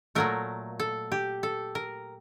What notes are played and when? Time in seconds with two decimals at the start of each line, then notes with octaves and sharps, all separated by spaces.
0.15 A#2 F#3 A3 A#4
0.80 A4
1.12 G4
1.43 A4
1.75 A#4